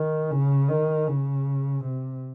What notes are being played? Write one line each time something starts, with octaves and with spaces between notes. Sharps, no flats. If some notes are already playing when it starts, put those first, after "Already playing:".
Already playing: D#3
C#3
D#3
C#3
C3